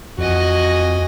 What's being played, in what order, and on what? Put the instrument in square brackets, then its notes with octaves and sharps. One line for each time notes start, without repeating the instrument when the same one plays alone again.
[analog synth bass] F2 [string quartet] F#4 D#5 G#5